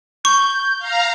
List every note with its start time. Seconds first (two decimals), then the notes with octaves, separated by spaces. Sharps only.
0.25 C#6 G6
0.79 F5 A#5